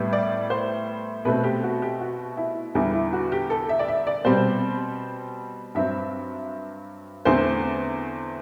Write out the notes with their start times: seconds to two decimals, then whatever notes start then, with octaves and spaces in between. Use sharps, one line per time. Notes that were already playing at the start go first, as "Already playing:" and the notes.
Already playing: A2 G3 B3
0.13 D5
0.50 C5
1.25 B2 A3 C4 B4
1.44 G4
1.63 F#4
1.82 G4
2.00 F#4
2.37 E4
2.75 E2 D3 G3 E4
2.93 E4
3.13 F#4
3.32 G4
3.50 A4
3.69 E5
3.79 D5
3.88 E5
4.07 D5
4.25 B2 G3 C4 C5
5.75 G2 F#3 C4 E5
7.25 E2 D3 A3 C4 C5